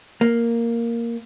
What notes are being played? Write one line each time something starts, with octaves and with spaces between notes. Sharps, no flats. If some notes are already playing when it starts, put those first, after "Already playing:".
A#3